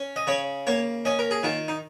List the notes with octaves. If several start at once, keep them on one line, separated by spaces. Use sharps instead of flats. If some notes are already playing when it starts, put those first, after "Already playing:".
Already playing: C#4
D#5
C#3 C#5
A#3 C#5
C#4 D#5
A#4
G#4
D#3 F4
D#4